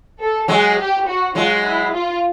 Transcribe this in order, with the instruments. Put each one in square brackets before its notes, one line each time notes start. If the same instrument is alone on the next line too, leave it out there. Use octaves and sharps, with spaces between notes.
[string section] A4
[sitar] F#3 G#3 [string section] G#4
[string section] G4
F#4
[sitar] F#3 G#3 [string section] F4
[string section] E4
F4